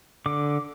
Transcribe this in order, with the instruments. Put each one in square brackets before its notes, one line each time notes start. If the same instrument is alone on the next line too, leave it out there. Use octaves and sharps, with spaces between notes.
[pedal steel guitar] D3 D6